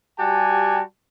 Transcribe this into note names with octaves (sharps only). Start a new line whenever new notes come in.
G3 F#4 G4 G#5 A5